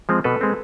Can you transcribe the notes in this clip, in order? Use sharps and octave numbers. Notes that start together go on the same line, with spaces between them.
F3 G#3 C4
B2 A4 B4
G#3 C4